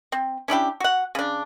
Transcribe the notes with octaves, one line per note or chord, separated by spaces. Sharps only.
C4
C#4 D4 E4 G4
F#4 F#5
C#3 D4